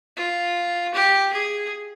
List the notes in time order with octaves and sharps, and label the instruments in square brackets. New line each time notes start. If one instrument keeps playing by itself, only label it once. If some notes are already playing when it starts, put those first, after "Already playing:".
[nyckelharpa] F4
G4
G#4